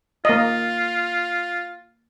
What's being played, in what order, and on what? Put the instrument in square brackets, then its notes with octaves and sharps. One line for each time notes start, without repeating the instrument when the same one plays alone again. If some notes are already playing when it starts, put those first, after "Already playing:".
[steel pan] A#3 D#5 [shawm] F4